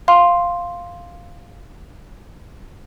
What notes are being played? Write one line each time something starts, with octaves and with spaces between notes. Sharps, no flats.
F5 C6 F6